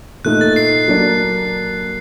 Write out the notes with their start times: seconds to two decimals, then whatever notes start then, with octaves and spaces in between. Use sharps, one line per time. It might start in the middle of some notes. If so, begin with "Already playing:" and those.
0.25 A#2 A3 D#4 F#6
0.41 A6
0.56 C7
0.88 F#3 A#3 D4